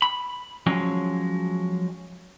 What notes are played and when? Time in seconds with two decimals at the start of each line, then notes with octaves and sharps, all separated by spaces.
0.02 B5
0.67 F3 F#3 G#3 C#4